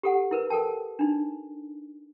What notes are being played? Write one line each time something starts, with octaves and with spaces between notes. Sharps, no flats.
G4 A4 F#5
E4 A#4 B4
A4 A#4 G5 A5
D4 D#4